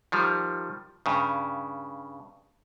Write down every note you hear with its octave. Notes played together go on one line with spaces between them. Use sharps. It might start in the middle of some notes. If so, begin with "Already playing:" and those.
D#3 F3 G3
G2 C#3